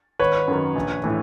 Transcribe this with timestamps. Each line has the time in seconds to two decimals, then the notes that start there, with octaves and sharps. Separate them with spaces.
0.19 G#1 B4 C#5
0.48 F#2 D#3
0.76 A#1
1.04 A2 E3